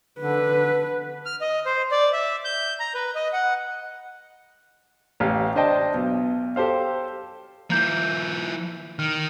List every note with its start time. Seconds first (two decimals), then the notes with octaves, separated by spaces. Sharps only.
0.19 D3 B4
1.26 F6
1.41 D#5
1.66 C5
1.91 D5
2.13 E5
2.45 G6
2.80 A#5
2.95 B4
3.15 D#5
3.33 F#5
5.20 A1 G4 F5
5.56 D4 C5 D#5 G5 A5
5.94 B1
6.56 G4 A4 C5 F5
7.70 F3 A#3 E4 G6
8.99 D#3 F6